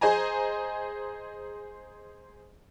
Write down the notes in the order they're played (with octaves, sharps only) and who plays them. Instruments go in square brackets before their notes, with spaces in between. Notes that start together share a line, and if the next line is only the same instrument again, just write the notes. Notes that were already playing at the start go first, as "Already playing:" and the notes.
[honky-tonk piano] G#4 C5 D#5 G#5 A#5